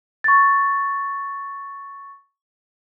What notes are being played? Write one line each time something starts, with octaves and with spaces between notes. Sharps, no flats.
C#6 A6